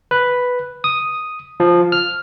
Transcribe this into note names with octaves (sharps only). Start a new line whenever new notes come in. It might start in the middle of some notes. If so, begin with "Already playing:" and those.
B4
D#6
F3
F6